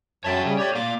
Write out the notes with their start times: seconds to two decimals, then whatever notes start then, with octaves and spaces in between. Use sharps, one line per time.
0.24 F#2 C#5 E5 G5 A5
0.45 C#3 G3
0.58 A3 G4 C#5 D5
0.75 A#3 D5 F5 D6